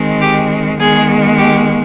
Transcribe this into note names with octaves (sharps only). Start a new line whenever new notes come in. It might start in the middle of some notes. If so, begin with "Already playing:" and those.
Already playing: D#3 G#3 C4
G4
D#3 G#3 B3 G#4
G4